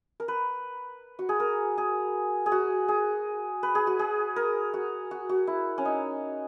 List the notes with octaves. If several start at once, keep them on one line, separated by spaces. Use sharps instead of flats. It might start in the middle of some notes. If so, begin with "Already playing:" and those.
A#4
B4
F#4
G#4
A#4
G#4
G#4
F#4
G#4
B4
G#4
F#4
G#4
A#4
F#4
F#4
F#4
E4
C#4
D#4